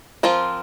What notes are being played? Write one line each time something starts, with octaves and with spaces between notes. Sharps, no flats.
F3 C4 F4 A#4